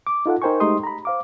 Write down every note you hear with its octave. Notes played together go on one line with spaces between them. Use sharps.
D6
D#4 F4 A4 F#5
D#4 A#4 C5 G5 G#5 C#6
G#3 A3 D#4 G4 C6 D#6
A#5 B5
C5 F5 D6